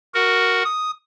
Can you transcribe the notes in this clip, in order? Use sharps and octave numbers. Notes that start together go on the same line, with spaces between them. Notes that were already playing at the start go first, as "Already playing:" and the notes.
F#4 A#4 F#5
D#6